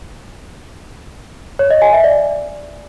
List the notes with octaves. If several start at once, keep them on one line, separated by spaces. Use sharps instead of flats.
C#5
D#5
G#5
E5
D5